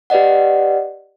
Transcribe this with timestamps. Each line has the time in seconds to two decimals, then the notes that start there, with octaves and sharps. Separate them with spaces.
0.10 G4 B4 D5 D#5 F#5